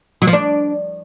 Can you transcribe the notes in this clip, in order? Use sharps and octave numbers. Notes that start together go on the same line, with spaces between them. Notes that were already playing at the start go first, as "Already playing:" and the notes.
F#3
F3
D4